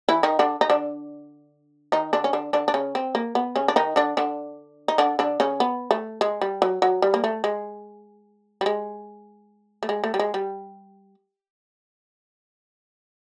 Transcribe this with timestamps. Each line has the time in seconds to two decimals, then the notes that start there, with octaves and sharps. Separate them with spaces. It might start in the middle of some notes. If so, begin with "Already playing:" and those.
0.09 E3 E4
0.23 D#3 D#4
0.39 D3 D4
0.61 D#4
0.70 D3 D4
1.92 D#3 D#4
2.13 D3 D4
2.24 C#4
2.33 D3 D4
2.53 D3 D4
2.68 D4
2.74 C#3 C#4
2.95 C4
3.15 A#3
3.35 B3
3.56 C#3 C#4
3.68 D4
3.76 D#3 D#4
3.96 D3 D4
4.17 D3 D4
4.88 D#4
4.98 D3 D4
5.19 D3 D4
5.40 C#3 C#4
5.60 B3
5.91 A3
6.21 G#3
6.42 G3
6.62 F#3
6.82 F#3
7.02 G3
7.14 A#3
7.24 A3
7.44 G#3
8.61 G3
8.66 G#3
9.83 A3
9.89 G#3
10.04 A3
10.14 G3
10.19 G#3
10.34 G3